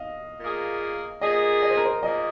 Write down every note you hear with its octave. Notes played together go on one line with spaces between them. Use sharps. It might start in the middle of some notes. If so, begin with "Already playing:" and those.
Already playing: D#5 F5
A#2 A#3 G#4
A#2 A#3 G#4 D#5
D#5
C5
A#4
C5
A#2 A#3 G#4 D#5